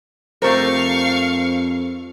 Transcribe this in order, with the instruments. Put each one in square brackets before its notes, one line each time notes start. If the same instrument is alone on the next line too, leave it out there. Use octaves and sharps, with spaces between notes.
[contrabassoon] F2 [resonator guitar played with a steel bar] A3 G4 A#4 [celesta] C5 [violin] F5 C#6